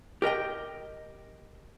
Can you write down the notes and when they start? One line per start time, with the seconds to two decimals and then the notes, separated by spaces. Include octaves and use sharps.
0.22 G4 A#4 D#5 G5